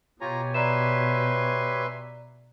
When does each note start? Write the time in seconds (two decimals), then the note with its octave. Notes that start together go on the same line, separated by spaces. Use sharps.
0.21 B2 F4 G4 C#5 G#5 A#5
0.54 B4 D5 E5 A#5 C6 E7